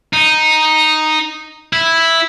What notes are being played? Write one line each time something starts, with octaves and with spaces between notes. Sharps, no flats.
D#4
E4